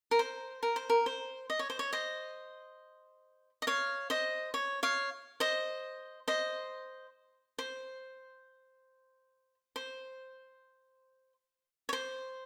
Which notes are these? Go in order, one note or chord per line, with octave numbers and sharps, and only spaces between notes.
A#4
C5
A#4
C5
A#4
C5
D#5
C#5
C5
C#5
C5 D#5
D#5
C#5 F5
C5 D#5
C#5
C#5 F5
C5 D#5
C5 D#5
C5
C5
C#5
C5